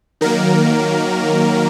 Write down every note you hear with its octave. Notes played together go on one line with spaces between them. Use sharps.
D#3 F#3 A#3 A#4